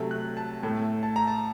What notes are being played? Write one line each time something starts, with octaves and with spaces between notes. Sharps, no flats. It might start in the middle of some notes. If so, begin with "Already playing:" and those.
Already playing: C3 F#3 A3
F#6
A5
A2 A3
A5
A#5
A5